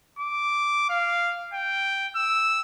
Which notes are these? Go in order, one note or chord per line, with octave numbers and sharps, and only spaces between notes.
D6
F5
G5
E6